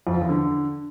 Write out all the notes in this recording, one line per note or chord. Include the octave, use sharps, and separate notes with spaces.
F2
F3
E2
D3